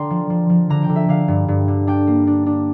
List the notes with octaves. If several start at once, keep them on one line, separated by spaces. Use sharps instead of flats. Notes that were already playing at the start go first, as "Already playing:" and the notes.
Already playing: D3 D5 G5 A#5 C6
F3
F3
F3
D3 A#5
G5
D3
E5
D3 F5
G2
G2
D3
D4 G5
A#3
D4
D4